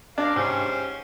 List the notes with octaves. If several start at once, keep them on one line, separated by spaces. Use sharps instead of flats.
A#3 D4 D5 F5
G#2 C#4 G4 C5